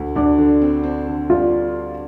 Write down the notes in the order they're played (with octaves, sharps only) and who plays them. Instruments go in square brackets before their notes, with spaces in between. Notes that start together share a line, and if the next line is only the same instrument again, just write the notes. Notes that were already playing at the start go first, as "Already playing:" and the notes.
Already playing: [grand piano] D2
[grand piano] D2 [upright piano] D4
[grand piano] D3
C4
C4
D3
[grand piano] G3 [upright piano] F4